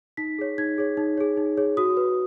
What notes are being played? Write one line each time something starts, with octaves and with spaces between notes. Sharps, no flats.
D#4 B6
G#4 C#5
D#4 G#6
G#4 C#5
D#4
G#4 C#5
D#4
G#4 C#5
F#4 D#6
B4